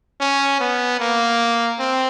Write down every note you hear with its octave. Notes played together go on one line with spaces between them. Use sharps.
C#4
B3
A#3
C4